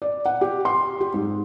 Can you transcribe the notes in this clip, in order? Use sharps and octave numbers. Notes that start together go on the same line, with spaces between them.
D5
F#5
G4
C6
G4
G#2